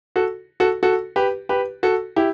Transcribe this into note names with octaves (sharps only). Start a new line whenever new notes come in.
F#4 A4
F#4 A4
F#4 A4
G4 B4
G4 B4
F#4 A4
E4 G4